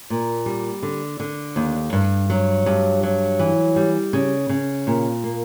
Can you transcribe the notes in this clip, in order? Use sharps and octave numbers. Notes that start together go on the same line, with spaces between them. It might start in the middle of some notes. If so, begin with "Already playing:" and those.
A#2
G3
D3
D3
D#2
G2
F#3
G2
F#3
E3
G3
C#3
C#3
A#2
A#3